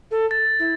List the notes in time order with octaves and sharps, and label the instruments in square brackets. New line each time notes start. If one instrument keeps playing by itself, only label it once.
[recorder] A4
[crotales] A6
[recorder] E4